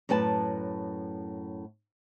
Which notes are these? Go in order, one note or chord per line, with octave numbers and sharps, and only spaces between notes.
F#2 A2 B4 G#5 A5